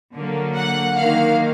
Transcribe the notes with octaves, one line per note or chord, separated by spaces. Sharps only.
D3 F#3 A#3
F#5
D#3 F#3 A#3 F5